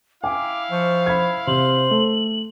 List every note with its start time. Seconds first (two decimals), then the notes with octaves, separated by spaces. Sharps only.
0.24 E4 F5 G5 G#5 D6
0.71 F3 C#6
1.06 B5 G#6
1.47 C3 C5 F#7
1.91 A3